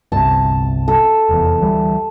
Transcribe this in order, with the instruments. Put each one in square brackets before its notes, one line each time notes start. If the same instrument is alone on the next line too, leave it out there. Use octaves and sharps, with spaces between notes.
[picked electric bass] G1 C2 C3 [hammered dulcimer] A5
[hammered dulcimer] A4
[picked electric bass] F1 E2
D2 E3 G3